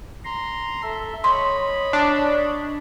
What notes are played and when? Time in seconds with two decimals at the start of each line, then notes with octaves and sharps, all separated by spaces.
0.25 A#5 C6
0.83 A4 E5
1.24 C#5 D#5 B5 C6
1.93 D4